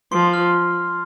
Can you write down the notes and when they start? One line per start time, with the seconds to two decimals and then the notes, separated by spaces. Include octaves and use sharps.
0.12 F3 C6
0.34 F6